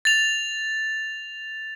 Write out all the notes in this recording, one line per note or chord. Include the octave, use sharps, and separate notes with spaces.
A6 F7